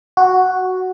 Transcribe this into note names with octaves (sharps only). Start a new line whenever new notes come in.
F#4